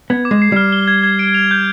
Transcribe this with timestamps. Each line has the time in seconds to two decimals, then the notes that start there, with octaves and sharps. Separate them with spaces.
0.10 B3 G#6
0.25 D6
0.31 G#3
0.42 C7
0.52 G3 F6
0.72 G7
0.88 G#6
1.03 G#6
1.19 D7
1.34 F7
1.51 G6